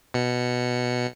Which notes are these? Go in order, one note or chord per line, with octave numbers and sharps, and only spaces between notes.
B2 C#7